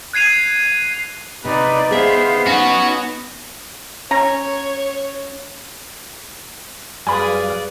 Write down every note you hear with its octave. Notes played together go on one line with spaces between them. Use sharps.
F#6 G#6 C7 D#7 F7
C3 D#4 B4 D5
B3 G#4 C5 E5 F5
C#4 D#4 F#4 C#5
C#4 C#5 A#5
F#2 G3 G#4 B4 D5 F5 G#5 B5